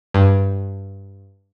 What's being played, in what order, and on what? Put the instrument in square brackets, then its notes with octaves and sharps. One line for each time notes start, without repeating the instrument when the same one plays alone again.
[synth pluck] G2